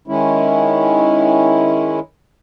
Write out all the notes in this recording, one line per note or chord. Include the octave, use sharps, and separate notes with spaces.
D#3 G#3 C#4 E4